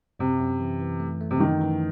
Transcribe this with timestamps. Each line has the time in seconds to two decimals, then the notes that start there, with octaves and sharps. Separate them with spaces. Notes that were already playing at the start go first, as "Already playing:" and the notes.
0.19 F#2 C3
0.40 F#2
0.60 E3
0.80 E3
1.00 A3
1.21 A3
1.31 C3
1.40 F#2 D#3
1.61 E3